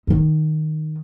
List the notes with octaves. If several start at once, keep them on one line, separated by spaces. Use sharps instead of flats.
D#3 D#4